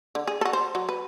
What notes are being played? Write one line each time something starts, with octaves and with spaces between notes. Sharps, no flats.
D3
G#4
F#4 A4
C5
F#3
B4